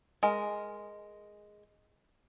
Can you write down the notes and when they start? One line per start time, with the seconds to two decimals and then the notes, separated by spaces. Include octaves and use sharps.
0.23 G#3 A#4